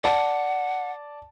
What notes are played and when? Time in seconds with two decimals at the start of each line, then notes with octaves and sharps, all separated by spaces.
0.04 D5 F#5 A5